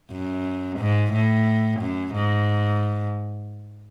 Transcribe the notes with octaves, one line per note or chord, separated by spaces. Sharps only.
F#2
G#2
A2
F#2
G#2